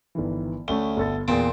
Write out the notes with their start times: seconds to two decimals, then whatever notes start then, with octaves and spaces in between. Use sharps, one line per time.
0.15 G1 D#3 E3
0.68 D2 A3 C#4 G7
0.97 G1 A4 A6
1.28 E2 A#2 C4 G#4